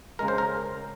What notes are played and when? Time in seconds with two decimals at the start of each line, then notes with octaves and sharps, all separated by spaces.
0.19 C#3 G#3 A#4
0.28 C5
0.38 A#4